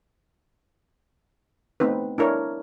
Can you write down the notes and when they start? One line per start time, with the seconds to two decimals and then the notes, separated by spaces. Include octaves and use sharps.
1.80 A3 B3 C4 D#4 B4
2.18 D4 E4 A#4 C#5